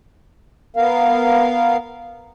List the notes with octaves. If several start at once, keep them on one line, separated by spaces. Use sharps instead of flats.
B3 A#4 F5